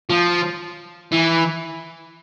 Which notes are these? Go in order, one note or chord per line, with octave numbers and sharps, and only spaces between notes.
F3
E3